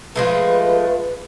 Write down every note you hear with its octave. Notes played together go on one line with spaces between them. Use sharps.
F3 G#3 A3 B4